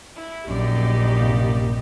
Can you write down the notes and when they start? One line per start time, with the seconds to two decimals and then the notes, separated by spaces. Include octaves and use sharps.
0.16 E4
0.48 A#1 F#2 D#4 G4 D5
1.20 G2 C3 A#3